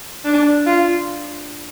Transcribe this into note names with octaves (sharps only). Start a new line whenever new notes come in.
D4
F4